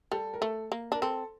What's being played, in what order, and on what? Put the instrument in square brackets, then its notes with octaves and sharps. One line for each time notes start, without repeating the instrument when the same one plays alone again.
[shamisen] G3 [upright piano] A4
[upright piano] A#4
[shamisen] A3 [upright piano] A4
[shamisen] A#3
[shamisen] D4 [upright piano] A#4
[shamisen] C4 [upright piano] A4